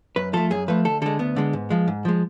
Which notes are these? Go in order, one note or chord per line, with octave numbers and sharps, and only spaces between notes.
F#2 B4
F3 A3 A4
F#2 G#4
F3 A3 B4
D2 A4
D3 G#3 A4
D2 B3
D3 G#3
G#2
F3 G#3
G#2
F3 G#3